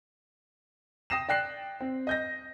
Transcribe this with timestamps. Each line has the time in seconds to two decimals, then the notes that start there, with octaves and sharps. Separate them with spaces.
1.10 G5 D#6 A#6 C7 E7
1.29 D5 G5 F#6 C7
1.81 C4
2.07 D#5 G6 A#6